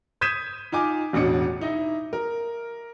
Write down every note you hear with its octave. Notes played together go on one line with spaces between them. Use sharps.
D#6 G6 G#6 B6 D#7 E7
D#4 F4 G#5 D6
E1 A1 B2 D4 C#7
D#4 E4 D#5
A#4